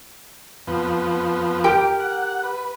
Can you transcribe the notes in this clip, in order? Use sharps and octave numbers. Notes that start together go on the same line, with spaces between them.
F2 F3 B3
G4 A#4 G5
F#5
B4